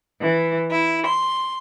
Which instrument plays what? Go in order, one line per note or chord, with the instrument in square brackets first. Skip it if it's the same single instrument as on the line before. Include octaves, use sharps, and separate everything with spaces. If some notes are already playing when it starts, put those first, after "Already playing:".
[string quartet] E3
E4
C6